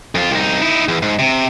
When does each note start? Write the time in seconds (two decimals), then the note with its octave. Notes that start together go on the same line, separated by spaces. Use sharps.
0.15 F2 F4
0.31 C2 D#4
0.62 D#4 E4
0.88 E2
1.02 G#2
1.19 C3